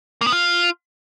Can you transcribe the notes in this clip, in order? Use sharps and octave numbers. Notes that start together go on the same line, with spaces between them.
A#3
B3
F4